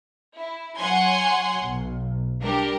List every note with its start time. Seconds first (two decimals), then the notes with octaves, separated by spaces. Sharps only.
0.38 E4
0.79 F#3 C#5 F#5 G#5 C6 G#6
1.62 B1
2.42 G3 D4 G4 A#4